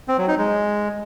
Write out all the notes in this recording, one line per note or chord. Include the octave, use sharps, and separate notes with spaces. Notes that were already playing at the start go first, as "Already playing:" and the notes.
C4
F#3
D#4
G#3